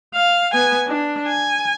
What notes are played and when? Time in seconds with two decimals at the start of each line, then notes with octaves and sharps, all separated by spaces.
0.15 F5
0.54 B3 G#5
0.87 D4
1.28 G#5